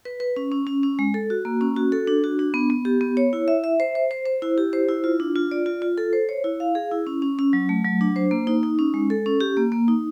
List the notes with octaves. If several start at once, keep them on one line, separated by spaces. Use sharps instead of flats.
B4
B4
C#4
C#4
C#4
C#4
G#3
A4
F#4
A#3
C#4
F#4
A4
D4
F#4
D4
B3
B3
G4
B3
C#5
E4
E5
E5
C5
C5
C5
C5
E4
G4
C5
E4
F4
D4
F4
D5
F4
F4
A4
C5
C#5
E4
F5
G#4
E4
C#4
C#4
C#4
F#3
A3
F#3
D4
C5
A#3
D#4
D#4
C#4
G#3
A4
C#4
G4
A#3
A#3
D#4